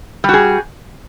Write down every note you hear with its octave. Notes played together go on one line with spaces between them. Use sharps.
G3 F#4 G#4